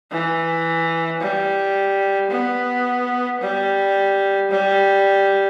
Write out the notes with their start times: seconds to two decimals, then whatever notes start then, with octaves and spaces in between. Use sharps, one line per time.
0.11 E3
1.20 G3
2.30 B3
3.41 G3
4.51 G3